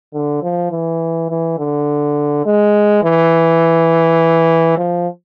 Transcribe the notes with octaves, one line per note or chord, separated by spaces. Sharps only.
D3
F3
E3
E3
D3
G#3
E3
F3